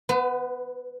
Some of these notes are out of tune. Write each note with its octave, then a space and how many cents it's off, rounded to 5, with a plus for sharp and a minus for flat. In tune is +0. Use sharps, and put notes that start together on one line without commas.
B3 +0 B4 +40